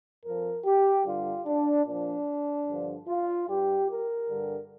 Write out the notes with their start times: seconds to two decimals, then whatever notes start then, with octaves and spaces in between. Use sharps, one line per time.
0.24 F2 F3 A#4
0.65 G4
1.05 G2 D3 G3 F4
1.46 D4
1.86 A#2 F3 D4
2.68 G2 D3 F3
3.08 F4
3.48 G2 G3 G4
3.89 A#4
4.29 G2 D3 G3